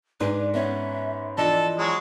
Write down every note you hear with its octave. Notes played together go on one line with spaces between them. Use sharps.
G#2 D4 B4 D5
B3 C#4 E5
E3 F3 D4 A4 D#5
F#3 G#3